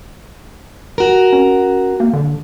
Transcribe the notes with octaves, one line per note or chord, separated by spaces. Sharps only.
F#4 A#4
C#4
A#3
D3